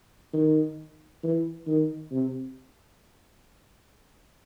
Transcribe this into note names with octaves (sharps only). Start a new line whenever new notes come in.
D#3
E3
D#3
C3